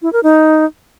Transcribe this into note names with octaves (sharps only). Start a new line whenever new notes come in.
E4
A#4
D#4